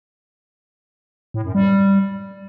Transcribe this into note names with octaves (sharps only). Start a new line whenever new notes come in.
A2
F#2
G3